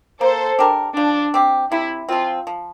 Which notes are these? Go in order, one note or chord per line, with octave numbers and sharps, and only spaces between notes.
A#3 A4 C5
D4 G4 A#4
F3 D4
C4 G4
C3 E4
F3 C4 F4
F3